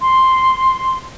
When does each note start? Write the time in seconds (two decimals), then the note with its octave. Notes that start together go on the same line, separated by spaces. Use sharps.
0.01 C6